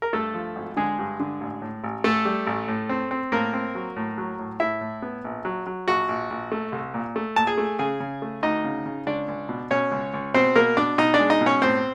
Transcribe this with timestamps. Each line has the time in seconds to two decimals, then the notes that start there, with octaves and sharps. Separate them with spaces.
0.02 A#4
0.13 G2 A3 A4
0.34 F3
0.56 G#1
0.77 D3 G#3 G#4
0.99 G2
1.20 D3
1.41 A1
1.62 A2
1.84 A1
2.04 A1 A3 A4
2.25 G3
2.47 A1
2.68 A2
2.89 C4
3.11 C4
3.32 A2 A#3 A#4
3.53 C4
3.75 F#3
3.96 A2
4.18 F#3
4.39 A2
4.60 A2 E4 E5
4.81 A2
5.02 B3
5.24 A#1
5.45 F#3
5.66 F#3
5.88 A#1 F#4 F#5
6.09 A#1
6.30 A#1
6.52 A3
6.72 C2
6.94 A#2
7.16 A3
7.36 A#2 A5
7.47 G#4 G#5
7.58 A3
7.79 C#3 G#4 G#5
8.00 C#3
8.22 A3
8.43 D2 D#4 D#5
8.64 C#3
8.86 C#3
9.07 C#2 D4 D5
9.28 C#2
9.49 B2
9.71 B2 C#4 C#5
9.92 C#2
10.14 C#2
10.34 B2 C4 C5
10.56 B2 A#3 A#4
10.77 B2 D4 D5
10.98 B2 D#4 D#5
11.14 D4 D5
11.19 G#3
11.30 D#4 D#5
11.41 B2
11.46 C#4 C#5
11.62 A2 C4 C5